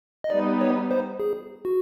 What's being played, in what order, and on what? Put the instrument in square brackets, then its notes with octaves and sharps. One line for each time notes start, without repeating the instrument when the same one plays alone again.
[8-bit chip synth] D#5
[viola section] G3 B3 D#4 [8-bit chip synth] D5
[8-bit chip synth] C#5
C5
G#4
F#4